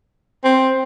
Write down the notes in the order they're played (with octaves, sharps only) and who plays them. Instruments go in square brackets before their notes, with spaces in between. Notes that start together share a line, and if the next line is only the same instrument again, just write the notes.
[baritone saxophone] C4